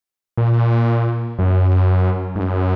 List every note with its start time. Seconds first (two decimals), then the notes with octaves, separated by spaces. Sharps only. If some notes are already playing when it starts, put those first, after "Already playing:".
0.37 A#2
1.39 F#2
2.36 G#2
2.40 F#2